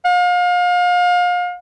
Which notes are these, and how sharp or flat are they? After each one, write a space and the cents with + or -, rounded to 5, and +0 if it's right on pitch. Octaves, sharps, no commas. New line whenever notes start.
F5 +35